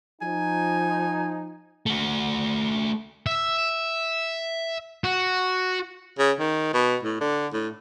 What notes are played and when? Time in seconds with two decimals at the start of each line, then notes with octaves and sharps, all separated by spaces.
0.22 F3 D#4 G#5
1.86 A3 F#4
3.26 E5
5.04 F#4
6.19 C#3
6.40 D#3
6.74 B2
7.03 A2
7.21 D3
7.53 A2